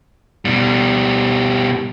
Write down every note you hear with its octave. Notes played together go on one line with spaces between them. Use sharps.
B2 G3